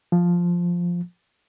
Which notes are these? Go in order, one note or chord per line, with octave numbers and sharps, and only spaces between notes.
F3